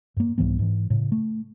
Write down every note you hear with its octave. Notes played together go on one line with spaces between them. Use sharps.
G2 A#3
C2 G#2 E3 B3
G#2 E3
A2 C#3
A3